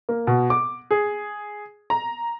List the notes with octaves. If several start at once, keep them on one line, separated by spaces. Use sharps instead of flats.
A#3
B2
D6
G#4
A#5